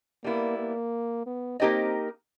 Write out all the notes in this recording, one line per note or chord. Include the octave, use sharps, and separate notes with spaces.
G3 A#3 B3 E4
A#3
B3
A#3 C4 D#4 G4 A#4 D#5